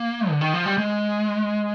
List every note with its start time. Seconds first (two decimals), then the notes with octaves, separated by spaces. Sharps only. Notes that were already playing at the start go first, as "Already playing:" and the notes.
Already playing: A#3
0.29 D3
0.41 D#3
0.53 F3
0.66 G3
0.78 G#3